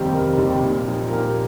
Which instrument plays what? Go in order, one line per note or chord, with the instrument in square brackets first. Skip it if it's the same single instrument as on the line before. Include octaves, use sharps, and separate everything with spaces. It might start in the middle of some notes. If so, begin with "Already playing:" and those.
Already playing: [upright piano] F1 D#2 D#3 G3 C4 G4
F1 A#4
D#2 D#3 G3 C4
A#2
F3 D#4
A#4
A#2 G4